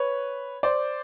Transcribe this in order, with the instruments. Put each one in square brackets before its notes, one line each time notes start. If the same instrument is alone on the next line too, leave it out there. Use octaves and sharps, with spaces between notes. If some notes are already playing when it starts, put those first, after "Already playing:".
Already playing: [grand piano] B4 C#5
C5 D5